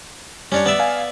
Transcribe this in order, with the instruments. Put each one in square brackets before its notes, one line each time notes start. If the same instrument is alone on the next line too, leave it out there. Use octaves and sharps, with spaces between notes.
[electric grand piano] G3 [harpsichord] C#4 D4 C#5
[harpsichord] B3 D5 E5
[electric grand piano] F5 G#5